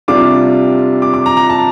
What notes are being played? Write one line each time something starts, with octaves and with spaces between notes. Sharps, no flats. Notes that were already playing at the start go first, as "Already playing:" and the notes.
C3 G3 D4 F4 D6
D6
D6
A#5
A#5
A5